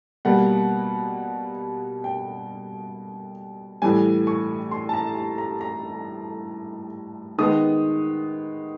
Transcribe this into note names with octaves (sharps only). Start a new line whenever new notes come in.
B2 G3 A#3 F#5
G5
A2 E3 G3 G#5
C#6
C6
A5
A#5
A5
A#5
A#5
D#3 G#3 B3 D#6